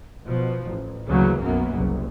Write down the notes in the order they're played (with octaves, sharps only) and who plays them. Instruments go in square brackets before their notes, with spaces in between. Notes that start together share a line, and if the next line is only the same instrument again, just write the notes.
[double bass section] B2 F3
A1
D2 C#3 E3 F#3 A#3
B1 F#2 F#3 A#3 B3
F#1 C2